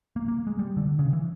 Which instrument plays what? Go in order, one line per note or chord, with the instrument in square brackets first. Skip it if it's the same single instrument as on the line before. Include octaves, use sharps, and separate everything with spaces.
[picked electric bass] A#3
A#3
G#3
G3
D3
C#3
E3